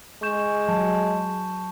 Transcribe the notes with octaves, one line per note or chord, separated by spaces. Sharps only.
G#3 C#6 G6 E7
F#3 A5